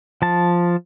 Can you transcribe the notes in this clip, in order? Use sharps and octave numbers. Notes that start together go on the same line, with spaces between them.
F3 A5